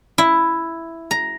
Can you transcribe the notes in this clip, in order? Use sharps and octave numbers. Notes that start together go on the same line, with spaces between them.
E4
A#5